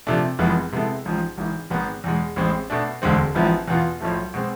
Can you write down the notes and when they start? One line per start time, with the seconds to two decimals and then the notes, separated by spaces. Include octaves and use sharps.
0.07 C3 F3 A3 D4
0.39 F1 F2 E3 G#3 B3
0.72 C3 G#3 B3 E4 A4
1.05 A1 G#2 F3
1.37 G#1 G#2 E3
1.70 G#1 G#2 G#3 B3
2.04 E2 B2 G#3
2.36 A1 A2 G#3 C4
2.70 B2 A3 D4
3.02 E1 D2 D3 G#3 C4
3.35 A1 G#2 F3 B3 E4
3.68 E2 B2 B3 F4
4.00 B1 A2 F3 A3
4.34 B2 G#3 C4 G#4